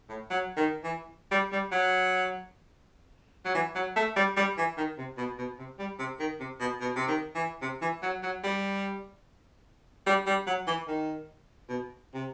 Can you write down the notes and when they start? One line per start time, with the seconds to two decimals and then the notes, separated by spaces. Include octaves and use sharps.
0.09 A2
0.30 F#3
0.57 D#3
0.84 E3
1.31 G3
1.52 G3
1.72 F#3
3.45 F#3
3.55 E3
3.75 F#3
3.96 A3
4.16 G3
4.37 G3
4.57 E3
4.77 D#3
4.98 C3
5.18 B2
5.38 B2
5.59 C3
5.79 G3
5.99 C3
6.20 D#3
6.40 C3
6.60 B2
6.81 B2
6.96 C3
7.08 D#3
7.35 E3
7.62 C3
7.82 E3
8.03 F#3
8.23 F#3
8.44 G3
10.06 G3
10.27 G3
10.47 F#3
10.67 E3
10.88 D#3
11.69 B2
12.14 C3